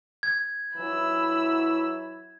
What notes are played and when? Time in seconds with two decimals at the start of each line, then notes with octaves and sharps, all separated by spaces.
0.23 G#6
0.77 E3 F#3 E4 B5 E6